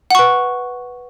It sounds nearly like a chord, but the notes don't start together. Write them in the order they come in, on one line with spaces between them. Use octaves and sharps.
F#5 C#6 B4